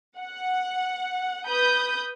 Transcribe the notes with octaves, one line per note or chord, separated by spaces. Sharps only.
F#5
B4 B5 D#6 G6